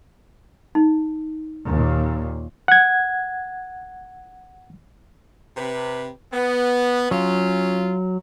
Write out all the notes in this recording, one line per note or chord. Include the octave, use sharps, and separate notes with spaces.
D#4
D#2 A#2
F#5 G#6
C3 B4
B3
F#3 C#4 F4